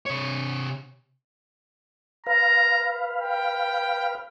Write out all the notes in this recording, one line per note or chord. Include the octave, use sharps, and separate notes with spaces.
C3 C#5
B4 F5 A#5
G5